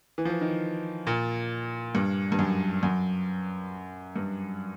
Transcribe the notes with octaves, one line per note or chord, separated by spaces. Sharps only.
E3
F3
E3
D#3
A#2
G2
G2
F#2
F#2
G2